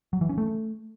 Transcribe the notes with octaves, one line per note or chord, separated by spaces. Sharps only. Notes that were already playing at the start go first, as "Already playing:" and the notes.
F#3
E3
C#4
A3